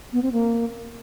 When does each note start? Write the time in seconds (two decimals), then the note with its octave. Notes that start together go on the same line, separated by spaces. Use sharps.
0.13 B3
0.23 C4
0.32 A#3